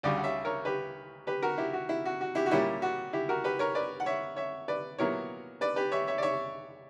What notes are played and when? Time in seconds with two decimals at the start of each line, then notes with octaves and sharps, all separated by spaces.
0.03 D2 C#3 G3 D5 F#5
0.17 F#5
0.24 C#5 E5
0.45 A#4 C#5
0.65 G4 B4
1.27 G4 B4
1.42 F#4 A#4
1.58 E4 G4
1.73 F#4
1.89 E4
2.05 F#4
2.21 F#4
2.35 E4 G4
2.46 F#4
2.51 A#2 G3 C#4 E4 G4
2.82 F#4
3.13 E4 G4
3.29 F#4 A#4
3.44 G4 B4
3.59 A#4 C#5
3.75 B4 D5
4.00 F#5
4.06 C#5 E5
4.36 C#5 E5
4.68 B4 D5
4.99 A#2 F#3 B3 E4 A#4 C#5
5.61 B4 D5
5.76 G4 B4
5.92 C#5 E5
6.07 C#5 E5
6.18 D5
6.23 C#5 E5